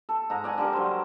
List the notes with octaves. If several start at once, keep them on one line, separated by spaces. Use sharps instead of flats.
A4
G#2 A#5
D5 F#5 G#5
D3 G3 A#4
F#3 C5